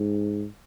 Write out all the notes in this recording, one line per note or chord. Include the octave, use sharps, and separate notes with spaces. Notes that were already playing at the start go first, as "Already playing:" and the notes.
Already playing: G#2